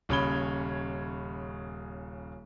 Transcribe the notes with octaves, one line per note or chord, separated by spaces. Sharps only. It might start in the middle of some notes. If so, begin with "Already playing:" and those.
D#1 C#3 C#5 B5 G7